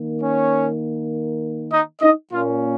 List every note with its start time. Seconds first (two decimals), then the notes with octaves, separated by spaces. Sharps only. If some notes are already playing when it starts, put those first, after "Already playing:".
Already playing: D#3 A#3
0.21 C#4 C#5
1.71 D#4 D#5
2.01 D#4 D#5
2.31 A#2 A#3 C#4 F4